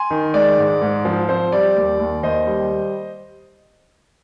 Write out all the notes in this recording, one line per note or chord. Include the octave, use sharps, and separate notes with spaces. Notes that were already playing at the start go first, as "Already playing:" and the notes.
Already playing: G#5 C6
D#3
G#3 D5
G#2
G#2
F3
C4 C5
G3 D5
D#2
D#2
D#2 C5 D#5
G3